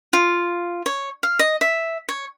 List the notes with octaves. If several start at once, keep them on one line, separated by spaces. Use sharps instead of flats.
F4
C#5
F5
D#5
E5
C#5